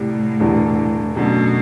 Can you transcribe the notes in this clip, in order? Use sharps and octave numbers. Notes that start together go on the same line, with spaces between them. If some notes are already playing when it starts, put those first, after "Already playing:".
Already playing: C2 A2 C3 G3
E1 E2 D3 G3
F#2 B2 D3 A3